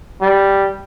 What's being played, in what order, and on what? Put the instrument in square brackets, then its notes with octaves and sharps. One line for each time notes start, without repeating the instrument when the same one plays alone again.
[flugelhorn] G3